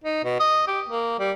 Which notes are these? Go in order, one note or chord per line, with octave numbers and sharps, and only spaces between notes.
D#4
B2
D#5
G4
A#3
G3